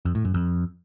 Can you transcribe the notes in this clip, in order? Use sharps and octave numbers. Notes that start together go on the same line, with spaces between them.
F2
A2
F#2
F2